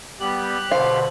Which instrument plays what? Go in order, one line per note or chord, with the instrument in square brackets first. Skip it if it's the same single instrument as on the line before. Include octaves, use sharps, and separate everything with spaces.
[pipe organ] G3 B3 [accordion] G4 F#6
[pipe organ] B2 D3 [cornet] C5 [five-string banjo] F5